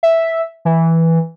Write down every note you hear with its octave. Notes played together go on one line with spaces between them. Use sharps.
E5
E3